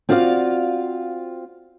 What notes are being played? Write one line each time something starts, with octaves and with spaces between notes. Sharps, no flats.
C4 F4 F#4 D5 D#5 F5